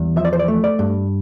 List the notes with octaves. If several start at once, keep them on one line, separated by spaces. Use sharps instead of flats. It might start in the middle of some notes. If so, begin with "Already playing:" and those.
Already playing: E2 G3
F3 E5
D5
C5
D5
A3
D5
G2